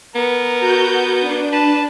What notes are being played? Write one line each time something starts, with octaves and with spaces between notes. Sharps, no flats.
B3 A#4
F#4 G6
D4
B4 A5